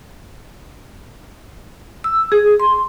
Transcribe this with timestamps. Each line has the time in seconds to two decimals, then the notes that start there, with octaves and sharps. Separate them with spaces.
2.04 E6
2.32 G#4
2.60 C6